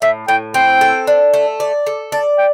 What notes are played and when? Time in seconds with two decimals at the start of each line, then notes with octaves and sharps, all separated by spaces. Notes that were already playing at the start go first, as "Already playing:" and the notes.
0.02 A2 E5
0.28 A2 G5
0.54 C4 G5
0.81 A4
1.07 D4
1.34 A3
1.60 D5
1.87 A4
2.12 D5 A5
2.38 G5